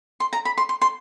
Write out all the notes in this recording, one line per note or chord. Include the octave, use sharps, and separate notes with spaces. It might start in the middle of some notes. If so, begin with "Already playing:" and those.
C6
A#5
B5
C6
C6
C6